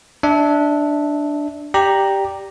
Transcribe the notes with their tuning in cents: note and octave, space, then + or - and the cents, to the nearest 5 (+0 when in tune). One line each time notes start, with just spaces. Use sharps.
D4 +0 E5 -20
G4 +0 D5 +0 A#5 +0